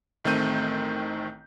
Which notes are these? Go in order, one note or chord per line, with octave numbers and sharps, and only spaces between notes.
A1 D#3 A3 C4 G6 D#7